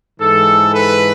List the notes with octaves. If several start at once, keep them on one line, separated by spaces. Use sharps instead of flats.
G#2 E3 A4
B4